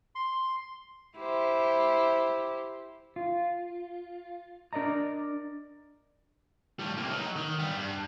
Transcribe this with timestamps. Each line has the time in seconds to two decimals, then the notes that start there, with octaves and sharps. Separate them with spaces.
0.15 C6
1.17 E4 G4 C5
3.16 F4
4.73 D4 A#4 D5 D#5 A#5
6.80 A2 G3
6.98 C3 A#3
7.10 F#3 D#4
7.36 D#3
7.59 G3 B3
7.77 G2